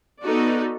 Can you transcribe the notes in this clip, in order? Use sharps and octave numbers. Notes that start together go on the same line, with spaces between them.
B3 D#4 F#4 A4 D5